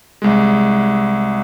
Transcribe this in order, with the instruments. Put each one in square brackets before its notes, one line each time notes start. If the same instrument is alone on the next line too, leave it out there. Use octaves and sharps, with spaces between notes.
[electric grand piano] C2 G#3